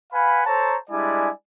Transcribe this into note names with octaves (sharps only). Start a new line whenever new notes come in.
B4 F5 F#5 G#5 B5
A4 C5 C#5 A5 A#5
G3 G#3 D4 E4 D5 G#5